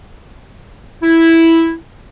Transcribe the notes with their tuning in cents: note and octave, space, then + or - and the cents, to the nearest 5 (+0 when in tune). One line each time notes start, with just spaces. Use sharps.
E4 -5